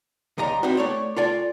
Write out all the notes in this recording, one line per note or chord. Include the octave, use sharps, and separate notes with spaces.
C#2 G3 D#5 A#5
C4 D#4 E4 F#4
A3 C#5 D5
F4 A4 D5 G#5